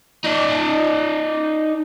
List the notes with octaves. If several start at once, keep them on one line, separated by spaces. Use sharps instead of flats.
D#4 D5